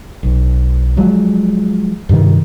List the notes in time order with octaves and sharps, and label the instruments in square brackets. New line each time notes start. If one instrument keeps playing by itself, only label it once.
[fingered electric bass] B1
F3 F#3 G#3
G2 C3 D#3